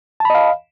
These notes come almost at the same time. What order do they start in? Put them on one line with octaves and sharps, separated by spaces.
A5 B5 D#5 F5